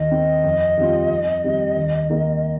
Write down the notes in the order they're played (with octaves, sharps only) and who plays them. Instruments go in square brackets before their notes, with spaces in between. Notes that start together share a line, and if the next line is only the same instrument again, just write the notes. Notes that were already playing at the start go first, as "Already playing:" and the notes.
Already playing: [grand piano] D#2 [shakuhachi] D#5
[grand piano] D#3 C4
F2
D#3 G3 C4 F4
F2
D#3 G3 C4
D#2
D#3 A#3 D#4